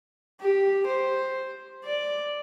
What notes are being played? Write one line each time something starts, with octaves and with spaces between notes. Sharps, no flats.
G4
C5
D5